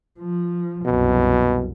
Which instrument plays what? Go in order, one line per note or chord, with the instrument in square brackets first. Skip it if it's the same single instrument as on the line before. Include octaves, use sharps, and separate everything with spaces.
[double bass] F3
[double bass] C2 F#2 [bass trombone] B2